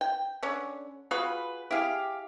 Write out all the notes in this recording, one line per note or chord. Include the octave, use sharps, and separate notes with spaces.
G5
D3 C#4
F4 F#4 G#4 B4
E4 G4 G#4 F5